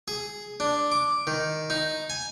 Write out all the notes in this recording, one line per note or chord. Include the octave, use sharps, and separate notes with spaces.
G#4
D4
D6
D#3
D#4
G#5